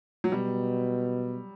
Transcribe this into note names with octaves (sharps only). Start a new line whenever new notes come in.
F#3
B2 G3